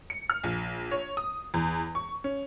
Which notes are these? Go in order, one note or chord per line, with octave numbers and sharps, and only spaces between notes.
C#7
F6
A#1
C#5
D#6
E2
C#6
C#4